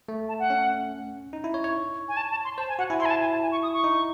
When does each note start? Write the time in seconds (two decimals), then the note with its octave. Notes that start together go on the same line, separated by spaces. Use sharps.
0.08 A3
0.29 A5
0.39 F#5
0.50 C#4
1.33 D#4
1.44 E4
1.54 C#5
1.64 C#5
2.08 G#5
2.17 A5
2.31 A5
2.44 C6
2.58 C5 A5
2.69 G#5
2.78 F#4 F#5
2.89 E4 G#5
3.00 E4 C6
3.05 G#5
3.10 A5
3.21 G#5
3.31 A5
3.42 G#5
3.52 C#6
3.63 D#6
3.73 C#6
3.84 D#4